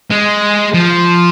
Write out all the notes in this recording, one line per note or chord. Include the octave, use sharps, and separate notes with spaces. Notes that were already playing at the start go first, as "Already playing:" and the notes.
G#3
F3